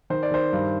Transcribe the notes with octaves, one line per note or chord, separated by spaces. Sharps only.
D#3 C5
D5
D#3 C5
G2